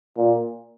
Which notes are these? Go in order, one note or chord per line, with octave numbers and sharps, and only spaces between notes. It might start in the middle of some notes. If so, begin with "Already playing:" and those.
A#2